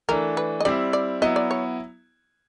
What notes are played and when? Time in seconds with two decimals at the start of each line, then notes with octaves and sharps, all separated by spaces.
0.09 E3 A3 D4 A#4
0.37 B4
0.60 D#5
0.65 G3 C4 E4 D5
0.93 D5
1.22 F#3 B3 E4 D#5
1.36 D5
1.51 C#5